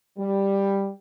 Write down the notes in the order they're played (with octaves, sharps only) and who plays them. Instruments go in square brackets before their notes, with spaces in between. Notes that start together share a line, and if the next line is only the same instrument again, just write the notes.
[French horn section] G3